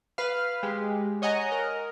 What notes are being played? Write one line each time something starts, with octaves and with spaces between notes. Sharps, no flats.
B4 F5
G#3 G4
C#5 D#5 F#5 G#5 A#5
A#4